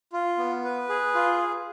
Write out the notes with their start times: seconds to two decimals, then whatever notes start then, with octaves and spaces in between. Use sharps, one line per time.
0.13 F4
0.38 B3
0.64 B4
0.89 G#4
1.15 F4